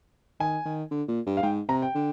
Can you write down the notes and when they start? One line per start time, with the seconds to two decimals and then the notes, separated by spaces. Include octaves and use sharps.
0.40 D#3 G#5
0.65 D#3
0.91 D3
1.08 A#2
1.27 G2
1.37 F5
1.43 G#2 G5
1.69 C3 A#5
1.82 G5
1.95 D3